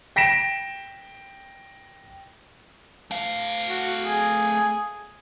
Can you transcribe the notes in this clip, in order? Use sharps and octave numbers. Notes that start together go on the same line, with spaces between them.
G5 A#6 B6 D7 E7
A3 F5
F#4
G#4